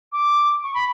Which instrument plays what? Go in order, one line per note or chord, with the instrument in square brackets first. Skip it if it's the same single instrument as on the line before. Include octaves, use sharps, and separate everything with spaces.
[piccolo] D6
C#6
B5